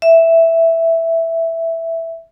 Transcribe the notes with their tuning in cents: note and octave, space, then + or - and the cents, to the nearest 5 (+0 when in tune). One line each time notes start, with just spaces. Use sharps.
E5 +0